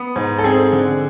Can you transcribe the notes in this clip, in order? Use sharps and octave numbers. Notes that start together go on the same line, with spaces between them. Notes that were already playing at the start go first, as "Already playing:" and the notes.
Already playing: B3
G#2
A4
C4 G#4
D3